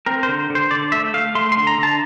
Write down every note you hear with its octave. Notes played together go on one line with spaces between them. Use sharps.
C4 A#4
C5
D3
D3
C5
D3 D5
A3 E5
A3 F5
A3 C6
C6
D3
A#5
D3
A5